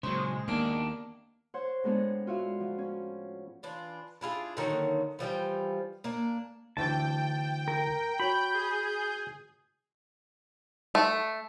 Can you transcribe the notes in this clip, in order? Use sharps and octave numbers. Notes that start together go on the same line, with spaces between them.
A#2 C#3 F#3 G#3 C5
D#2 A#3 B3 D4
C5 C#5 F#5
A2 G#3 B3 D4 G#4
C#4 F4 F#4 E5 F5
F3
C#4
E3 D4 F4
D4 E4 F4 G#4
D3 D#3 F#3 A#3
E3 F3 G3 G5
A#3 D4
D2 D3 E3 G5 A5
A#4
F#4 C#5 B5 G6
G#4
A3